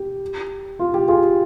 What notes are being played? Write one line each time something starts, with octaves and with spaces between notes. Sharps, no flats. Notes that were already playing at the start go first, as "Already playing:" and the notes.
Already playing: G4
F4
G4
F4 G#4